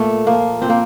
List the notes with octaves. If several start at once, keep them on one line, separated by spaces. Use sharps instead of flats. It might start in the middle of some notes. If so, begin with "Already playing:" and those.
Already playing: A#2 A3
F3 A#3
A#2 C4
A#3